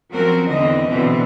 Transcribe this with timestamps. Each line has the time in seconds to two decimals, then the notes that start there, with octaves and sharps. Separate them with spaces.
0.10 F3 F#3 C4 C#4 F#4 A#4
0.48 E2 D3 E3 C4 C#4 D#5
0.87 B2 D3 E3 C4